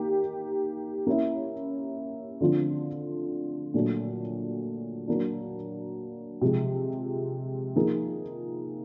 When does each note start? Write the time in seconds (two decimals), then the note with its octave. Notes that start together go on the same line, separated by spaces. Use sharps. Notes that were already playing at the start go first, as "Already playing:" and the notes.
Already playing: A#3 D#4 G4
1.07 A#3 C#4 E4
2.40 D3 F3 A3 C4 F4
3.74 A#2 F#3 A3 D4
5.08 F#3 A#3 D4
6.41 C3 F3 G#3
7.76 F3 A#3 D#4 G#4